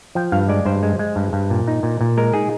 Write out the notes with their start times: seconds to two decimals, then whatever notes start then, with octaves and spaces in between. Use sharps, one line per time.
0.15 F3 G5
0.32 G2 F5
0.49 G#3 D5
0.66 G2 C5
0.83 G#3
0.99 G#3
1.16 G2
1.33 G2
1.50 A#2
1.68 D#4
1.83 A#2
2.01 A#2
2.17 G#3 A#4
2.33 D#4 G#4